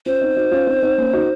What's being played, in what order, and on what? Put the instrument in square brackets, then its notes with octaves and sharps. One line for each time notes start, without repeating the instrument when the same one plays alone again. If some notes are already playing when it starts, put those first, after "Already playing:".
[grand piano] C#4 F4 [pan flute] C5
[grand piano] C4 D#4
D#4 F#4
C#4 F4
C4 D#4
C4 D#4
A#3 C#4
D#4 F#4